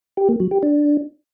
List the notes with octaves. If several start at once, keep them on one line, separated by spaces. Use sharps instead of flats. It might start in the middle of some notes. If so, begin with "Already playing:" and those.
G4
A#3
F#3
G4
D4